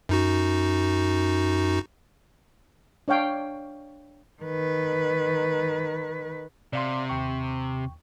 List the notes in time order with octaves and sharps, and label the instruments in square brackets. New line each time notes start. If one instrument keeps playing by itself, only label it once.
[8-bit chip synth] F#2 D#4 F#4
[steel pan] D4 C#5 F5 G5
[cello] D#3 B4
[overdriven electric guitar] C3 [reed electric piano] D5 F5 C6
[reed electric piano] D#2 G5 C#6